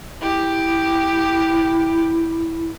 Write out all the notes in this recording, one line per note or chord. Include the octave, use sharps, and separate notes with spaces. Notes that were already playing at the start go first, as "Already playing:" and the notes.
E4 G4